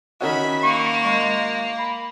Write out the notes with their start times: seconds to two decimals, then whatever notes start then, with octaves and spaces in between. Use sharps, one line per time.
0.21 D#3 C#4 F#4 E5 B5
0.63 A#3 C#6
1.03 G#3
1.78 B5